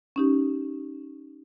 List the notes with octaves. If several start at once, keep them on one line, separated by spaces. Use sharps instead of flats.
C#4 D#4 G4